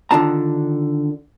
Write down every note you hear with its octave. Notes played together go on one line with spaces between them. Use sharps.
D3 D#3 D4 F4 A5 A#5